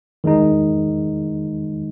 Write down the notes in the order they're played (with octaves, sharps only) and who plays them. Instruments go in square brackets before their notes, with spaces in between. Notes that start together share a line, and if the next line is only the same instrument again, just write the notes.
[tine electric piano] D#3 G#3 D#4